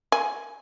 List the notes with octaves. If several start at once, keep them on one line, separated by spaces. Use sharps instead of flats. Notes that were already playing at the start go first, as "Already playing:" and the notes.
G#5